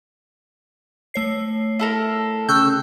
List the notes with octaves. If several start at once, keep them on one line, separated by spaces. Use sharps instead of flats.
A3 C#5 C7
E4 A4 A#4
C#3 G5 C#6 E6 F#6 G6